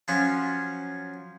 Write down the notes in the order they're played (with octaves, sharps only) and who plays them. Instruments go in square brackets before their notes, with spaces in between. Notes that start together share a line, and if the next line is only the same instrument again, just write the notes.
[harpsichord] F3 F#3 C#4 F4